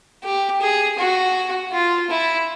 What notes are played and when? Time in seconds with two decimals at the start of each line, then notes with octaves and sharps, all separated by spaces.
0.23 G4
0.61 G#4
0.98 F#4
1.72 F4
2.10 E4